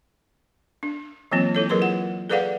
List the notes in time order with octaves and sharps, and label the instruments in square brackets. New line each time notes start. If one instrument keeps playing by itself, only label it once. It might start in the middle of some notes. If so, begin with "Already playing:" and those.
[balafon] D4
E3 F#3 A#3 C4 F4
E4 A4 C#5
F#3 G#4 A#4 B4 C6
F4 F#5
G#4 A4 B4 D5 F5 F#5